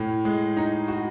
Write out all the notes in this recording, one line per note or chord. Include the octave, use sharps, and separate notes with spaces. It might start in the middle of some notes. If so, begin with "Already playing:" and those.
Already playing: A2
G#3
D#4
F#4